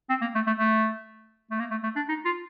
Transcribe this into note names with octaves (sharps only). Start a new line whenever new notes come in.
C4
A#3
A3
A3
A3
A3
A#3
A3
A3
D4
D#4
F4